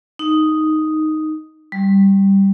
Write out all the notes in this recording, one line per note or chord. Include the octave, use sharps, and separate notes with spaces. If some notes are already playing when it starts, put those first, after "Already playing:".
D#4
G3